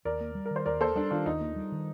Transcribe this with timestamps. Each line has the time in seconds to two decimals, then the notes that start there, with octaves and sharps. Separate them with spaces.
0.05 D#2 A#4 D5
0.21 A#3
0.35 G3
0.45 A#4
0.51 D#3
0.56 C5
0.66 D#2 A#4 D5
0.81 A#3 A4 C5
0.95 G3 D4
1.11 D#3 D4 F4
1.26 D#2 D#4
1.41 A#3
1.56 G3
1.72 D#3